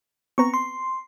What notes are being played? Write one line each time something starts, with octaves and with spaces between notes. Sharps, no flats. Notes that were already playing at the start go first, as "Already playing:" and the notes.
B3 C4 B4 A#5 C#6
C6